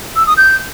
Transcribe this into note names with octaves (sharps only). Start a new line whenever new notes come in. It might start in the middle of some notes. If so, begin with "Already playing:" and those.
E6
D#6
G6